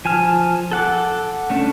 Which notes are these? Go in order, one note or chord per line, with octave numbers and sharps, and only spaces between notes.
F3 G#5 A5 F6
A4 F#5 D6
A3 C#4 D4